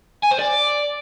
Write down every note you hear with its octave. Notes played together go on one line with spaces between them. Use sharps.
G#5
C5
D5